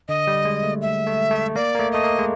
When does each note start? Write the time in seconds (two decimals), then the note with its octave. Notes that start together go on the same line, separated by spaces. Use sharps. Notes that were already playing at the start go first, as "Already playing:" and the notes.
0.08 D3 D#5
0.27 G3
0.45 G#3
0.64 A3
0.82 E5
1.07 A3
1.31 A3
1.55 A#3 D5
1.75 A#3
1.79 A3
1.92 A3 D#5
2.04 A#3
2.19 G#3